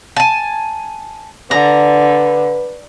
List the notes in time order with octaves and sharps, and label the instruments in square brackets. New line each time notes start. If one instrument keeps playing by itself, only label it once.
[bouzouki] G#5 A5
[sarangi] D3 [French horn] B4 [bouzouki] A#5